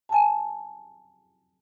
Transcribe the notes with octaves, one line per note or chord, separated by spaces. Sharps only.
G#5 A5